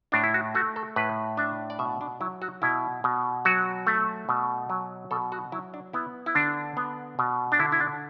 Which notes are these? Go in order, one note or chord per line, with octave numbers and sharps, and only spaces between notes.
A2 D4
E4
F#4
A3 F#4
A4
A2 B4
D4 E5
D5
B2 E5
D4
F#3 E4
F#4
B2 E4
B2
F#3 F#4
A3
B2
F#3
B2 A4
F#4
F#3 E4
D4
B3 E4
E4
D3 D4
B3
B2
D4
D3 E4
E4
D4